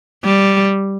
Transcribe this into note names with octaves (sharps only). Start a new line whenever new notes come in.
G3